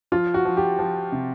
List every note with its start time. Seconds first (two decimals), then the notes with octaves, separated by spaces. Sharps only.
0.12 F3 F4
0.34 F#4
0.45 F3
0.57 G4
0.79 F3
1.12 C3